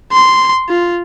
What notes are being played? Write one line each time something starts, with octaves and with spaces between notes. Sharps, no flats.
C6
F4